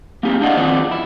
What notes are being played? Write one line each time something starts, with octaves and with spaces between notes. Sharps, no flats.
A#3 C4 D#4 G4
D4 E4 D5 D#5 F5 F#5
D#3 F3 B3 C4 D5
E4